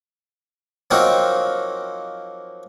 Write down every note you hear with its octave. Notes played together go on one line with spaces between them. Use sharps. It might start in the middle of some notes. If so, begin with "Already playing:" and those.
F3 F#3 A#3 C4 D#4 F#4